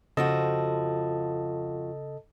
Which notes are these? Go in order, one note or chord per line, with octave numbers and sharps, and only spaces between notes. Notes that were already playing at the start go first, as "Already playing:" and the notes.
F2 C#3 F3 F#4 A4 D#5 A5